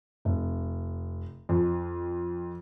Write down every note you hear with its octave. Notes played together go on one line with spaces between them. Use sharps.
F1
F2